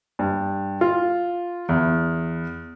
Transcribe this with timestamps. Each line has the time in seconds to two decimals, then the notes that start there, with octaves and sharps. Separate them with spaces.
0.19 G2
0.81 F4
1.69 E2